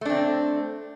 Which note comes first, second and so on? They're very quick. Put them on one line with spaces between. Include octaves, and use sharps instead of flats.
A3 D4 C4